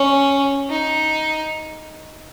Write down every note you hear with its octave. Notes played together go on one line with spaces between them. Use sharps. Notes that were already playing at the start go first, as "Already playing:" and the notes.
Already playing: C#4
D#4